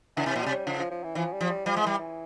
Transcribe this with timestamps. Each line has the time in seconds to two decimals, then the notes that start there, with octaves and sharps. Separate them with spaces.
0.17 C#3 E3
0.26 C3
0.36 A#2
0.41 G3
0.46 C3
0.67 C#3 F3
0.79 F3
0.91 F3
1.04 E3
1.15 E3 F3
1.33 G3
1.41 F3
1.50 G3
1.66 F3 G3
1.76 G#3
1.82 E3 G3
1.99 E3